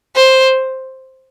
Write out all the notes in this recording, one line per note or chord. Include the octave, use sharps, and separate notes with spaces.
C5